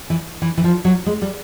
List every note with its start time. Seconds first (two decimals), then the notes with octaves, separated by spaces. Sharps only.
0.10 E3
0.42 E3
0.57 E3
0.64 F3
0.85 F#3
1.06 G#3
1.22 G3